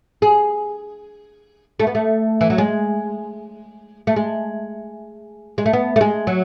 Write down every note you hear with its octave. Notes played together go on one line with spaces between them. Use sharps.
G#4
A3
B3
A3
E3
F#3
G#3
A3
G#3
G#3
A3
B3
A3
G#3
F#3